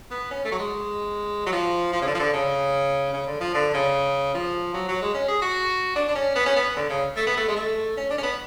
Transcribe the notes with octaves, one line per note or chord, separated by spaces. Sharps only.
B3
C#4
A3
F#3
G#3
F#3
F3
F3
C#3
D3
F3
D3
C#3
C#3
D3
F3
D3
C#3
F3
F#3
F#3
G#3
C#4
G#4
F#4
D4
D4
C#4
B3
C#4
B3
D3
C#3
A3
B3
A3
G#3
A3
C#4
D4
C#4
B3